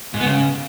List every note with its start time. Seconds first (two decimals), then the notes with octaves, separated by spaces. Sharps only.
0.14 G#2
0.20 B3
0.26 C#3